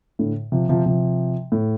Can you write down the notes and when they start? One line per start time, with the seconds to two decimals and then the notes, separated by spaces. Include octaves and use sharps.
0.19 A2 D3
0.52 C3 F3
0.69 C3 F3
0.86 C3 F3
1.52 A2